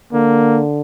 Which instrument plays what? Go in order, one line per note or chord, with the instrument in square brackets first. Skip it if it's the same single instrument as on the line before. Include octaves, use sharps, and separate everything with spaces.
[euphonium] D3 [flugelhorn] A#3